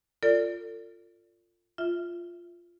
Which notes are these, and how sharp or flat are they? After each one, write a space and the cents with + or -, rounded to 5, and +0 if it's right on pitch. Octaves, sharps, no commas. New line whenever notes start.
F4 +0 A4 +40 D5 -15
F4 -5 E5 +0